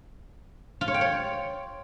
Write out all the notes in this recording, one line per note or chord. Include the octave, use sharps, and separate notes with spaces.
F4
C#5
G5
C#5